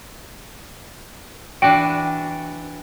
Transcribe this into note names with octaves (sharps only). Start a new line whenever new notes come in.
E3 D4 F#4 G5